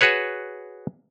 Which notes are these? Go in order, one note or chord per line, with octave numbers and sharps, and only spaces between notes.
F#4 G#4 B4 C#5